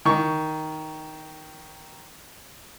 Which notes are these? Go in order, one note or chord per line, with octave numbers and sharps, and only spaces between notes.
D#3 C#6